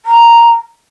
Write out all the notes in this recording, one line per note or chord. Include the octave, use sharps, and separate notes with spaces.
A#5